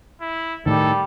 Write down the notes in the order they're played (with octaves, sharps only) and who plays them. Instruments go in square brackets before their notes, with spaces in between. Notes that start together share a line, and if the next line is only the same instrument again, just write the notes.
[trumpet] E4
[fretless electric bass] A2 D#3 [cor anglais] G3 [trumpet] A4